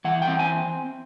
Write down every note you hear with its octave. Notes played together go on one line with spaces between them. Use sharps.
E3 F#5
G5
C4
G#5